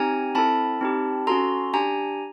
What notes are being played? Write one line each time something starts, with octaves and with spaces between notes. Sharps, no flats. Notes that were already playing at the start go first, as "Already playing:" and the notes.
Already playing: C4 D#4 G4 G#5 A#5
C4 E4 A4 A5 B5
C4 D#4 G4
C#4 F#4 A4 A#5 C6
D4 G4 G#5 A#5